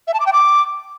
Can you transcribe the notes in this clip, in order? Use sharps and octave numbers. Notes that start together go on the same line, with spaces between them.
E5
A5
D6
G5
D6